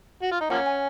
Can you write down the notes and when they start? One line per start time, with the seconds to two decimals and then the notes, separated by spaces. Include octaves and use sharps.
0.22 F#4
0.32 F4
0.41 D#4
0.50 F3 A#3 C#4 F#5
0.66 G#5